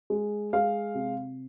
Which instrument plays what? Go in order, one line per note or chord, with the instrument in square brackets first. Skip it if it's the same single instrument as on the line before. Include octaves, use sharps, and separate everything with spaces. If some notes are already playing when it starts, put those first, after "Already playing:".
[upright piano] G#3
G#3 F5
C3